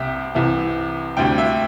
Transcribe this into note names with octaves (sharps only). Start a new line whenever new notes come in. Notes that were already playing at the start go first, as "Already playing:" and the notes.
Already playing: C2 C3 E5 G5
C2 C3 E3
D2 C3 G3 G5
E5